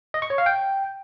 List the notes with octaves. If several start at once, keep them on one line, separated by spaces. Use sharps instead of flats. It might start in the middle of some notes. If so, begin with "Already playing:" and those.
D#5
C#6
C#5
F5
G5